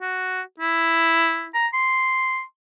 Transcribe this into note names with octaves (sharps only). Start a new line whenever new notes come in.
F#4
E4
A#5
C6